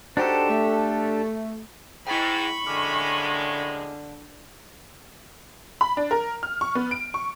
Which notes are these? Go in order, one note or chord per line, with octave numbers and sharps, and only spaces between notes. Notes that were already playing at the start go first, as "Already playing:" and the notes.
D4 D#4 F#4 G4 A4 C5
A3
G#2 E4 G5 B5 C#6
F#2 A2 D3 G#3 D6 F6
B5
D4
A#4
F6
C#6
B3
D7
C#6